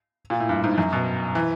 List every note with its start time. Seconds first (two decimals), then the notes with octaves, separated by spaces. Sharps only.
0.30 A#2
0.40 A2
0.49 G2
0.64 G#2
0.78 F#2
0.92 B2
1.35 E3